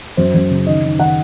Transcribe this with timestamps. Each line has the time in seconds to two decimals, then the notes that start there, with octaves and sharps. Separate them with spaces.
0.17 F#2 C5
0.34 F#2
0.51 C#3
0.66 D#3 D#5
0.83 D#3
0.99 D#3 F#5